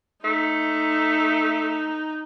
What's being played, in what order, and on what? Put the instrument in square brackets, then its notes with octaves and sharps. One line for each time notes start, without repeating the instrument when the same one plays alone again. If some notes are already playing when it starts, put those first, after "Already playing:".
[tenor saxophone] A3 [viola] D#4